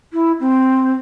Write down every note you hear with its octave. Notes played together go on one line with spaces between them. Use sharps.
E4
C4